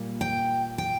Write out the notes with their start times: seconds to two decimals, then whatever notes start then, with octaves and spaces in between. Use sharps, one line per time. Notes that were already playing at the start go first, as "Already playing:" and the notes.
Already playing: A#2 G3 A#3
0.21 G5
0.78 G5